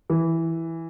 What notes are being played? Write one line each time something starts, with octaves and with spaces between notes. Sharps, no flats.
E3